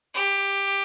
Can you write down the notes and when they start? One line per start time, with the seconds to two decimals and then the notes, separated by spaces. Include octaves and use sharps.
0.15 G4